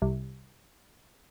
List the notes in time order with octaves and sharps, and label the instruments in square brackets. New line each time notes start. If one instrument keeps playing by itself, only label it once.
[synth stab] C2